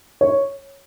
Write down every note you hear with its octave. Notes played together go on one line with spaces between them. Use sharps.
C#5